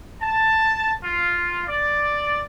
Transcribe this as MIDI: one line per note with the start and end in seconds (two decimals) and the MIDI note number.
0.21 0.93 81
1.03 1.64 65
1.66 2.41 74